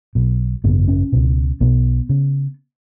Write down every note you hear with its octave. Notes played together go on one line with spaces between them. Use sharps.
B1 B2
G#1 F#2 C#3 B3
C#4
C#2 B2
B1 B2 B3
C#3